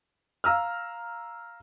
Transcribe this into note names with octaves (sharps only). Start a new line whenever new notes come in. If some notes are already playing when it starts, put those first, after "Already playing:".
F5 A#5 E6 F6